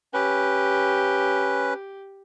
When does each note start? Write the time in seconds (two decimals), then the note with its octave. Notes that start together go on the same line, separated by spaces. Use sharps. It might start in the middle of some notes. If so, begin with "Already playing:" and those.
0.14 C#4 G4 B4